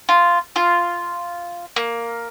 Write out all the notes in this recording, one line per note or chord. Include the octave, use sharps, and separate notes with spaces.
F4
F4
A#3